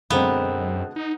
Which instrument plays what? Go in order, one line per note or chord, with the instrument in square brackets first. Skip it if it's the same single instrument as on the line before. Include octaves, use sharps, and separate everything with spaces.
[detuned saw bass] F#2 [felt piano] B2 D3 G#3 [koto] B3 [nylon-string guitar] C4 A#4 F5
[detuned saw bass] D#4